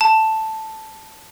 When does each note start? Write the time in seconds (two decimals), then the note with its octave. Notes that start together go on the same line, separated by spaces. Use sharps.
0.01 A5